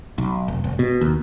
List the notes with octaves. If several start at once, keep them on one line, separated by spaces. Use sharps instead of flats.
B1
F1
F1
B2
D#2